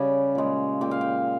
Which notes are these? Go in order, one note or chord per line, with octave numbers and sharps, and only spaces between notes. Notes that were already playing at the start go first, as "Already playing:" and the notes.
Already playing: C#3 G3 G#5
A#2 G#3
A#2 G#3 G5
F5
G5